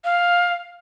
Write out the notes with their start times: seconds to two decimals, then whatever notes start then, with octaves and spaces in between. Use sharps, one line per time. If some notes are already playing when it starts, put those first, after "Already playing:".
0.04 F5